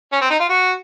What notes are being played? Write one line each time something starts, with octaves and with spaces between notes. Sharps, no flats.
C#4
C4
D#4
F4
F#4